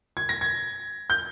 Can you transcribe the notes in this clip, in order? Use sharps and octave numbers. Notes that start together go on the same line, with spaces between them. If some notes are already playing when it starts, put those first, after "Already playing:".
G#6
A#6
G#6
G6